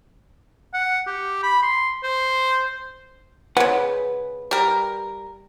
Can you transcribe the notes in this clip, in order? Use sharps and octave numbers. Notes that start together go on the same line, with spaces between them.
F#5
G4
B5
C6
C5
C#3 G#3 B4 F#5
G3 A#4